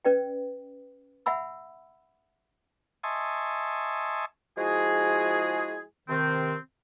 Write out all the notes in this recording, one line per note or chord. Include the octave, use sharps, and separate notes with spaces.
C#4 B4 D5 G5
E5 F#5 G#5 B5 E6
D#5 E5 G#5 A5 C6 C#6
F3 G#3 E4 F#4 G#4
C3 D#3 C4